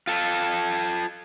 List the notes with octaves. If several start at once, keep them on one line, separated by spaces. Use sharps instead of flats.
F4 A4